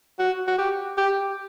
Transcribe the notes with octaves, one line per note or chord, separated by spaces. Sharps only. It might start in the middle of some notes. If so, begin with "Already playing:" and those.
F#4
F#4
G4
G4